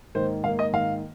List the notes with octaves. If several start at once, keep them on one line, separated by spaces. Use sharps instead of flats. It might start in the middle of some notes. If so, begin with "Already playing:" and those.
G#2 D#3 A#3 C5
G#2 D#3 A#3 F5
D#5
G#2 D#3 A#3 F5